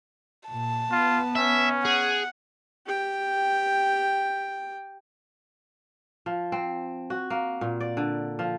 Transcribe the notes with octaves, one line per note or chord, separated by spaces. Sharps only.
A#2 A5
B3 F4
C#4 E5
G#4 F#5
G4 G5
F3
C4
F#4
A#3
A#2
D5
D3
F3